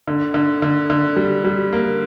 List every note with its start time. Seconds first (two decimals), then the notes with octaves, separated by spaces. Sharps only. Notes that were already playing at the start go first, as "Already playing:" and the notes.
0.07 D3
0.34 D3
0.62 D3
0.90 D3
1.16 G3
1.44 G3
1.73 A#3